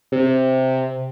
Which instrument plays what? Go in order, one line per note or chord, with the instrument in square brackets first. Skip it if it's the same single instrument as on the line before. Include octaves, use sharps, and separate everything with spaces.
[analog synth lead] C3